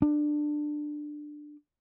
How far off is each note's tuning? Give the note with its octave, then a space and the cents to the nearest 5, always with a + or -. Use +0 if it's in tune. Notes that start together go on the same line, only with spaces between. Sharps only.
D4 +15